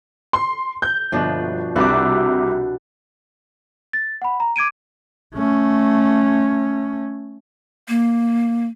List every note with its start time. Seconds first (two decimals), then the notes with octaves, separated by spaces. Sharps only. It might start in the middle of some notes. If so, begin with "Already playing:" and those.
0.33 C6
0.82 G6
1.12 G1 B2 F3 D4
1.76 C2 C3 D4 F#4 B4 D6
3.93 A6
4.22 F#5 B5
4.40 A#5
4.56 D6 G#6 D7 D#7
5.34 A3 C#4
7.89 A#3